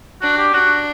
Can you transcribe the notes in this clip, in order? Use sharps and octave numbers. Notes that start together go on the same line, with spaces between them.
D4 F#4
G4
D4 F#4